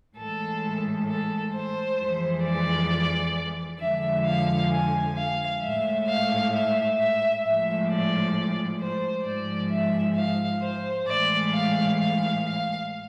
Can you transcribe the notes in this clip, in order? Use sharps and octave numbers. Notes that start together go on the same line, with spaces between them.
A2 E3 G#3 A4
A4
C5
F2 E3 G#3
D5
F2 D3 F3 G#3 E5
F5
G#5
F5
A2 G#3 E5
F5
E5
E5
A2 F3 G#3 E5
D5
C5
G#2 F3 G#3 D5
E5
F5
C5
A2 E3 G#3 D5
F5
F5
F5